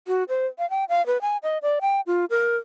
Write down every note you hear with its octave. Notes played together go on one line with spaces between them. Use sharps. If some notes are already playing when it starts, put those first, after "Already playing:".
F#4
C5
F5
G5
F5
B4
G#5
D#5
D5
G5
F4
A#4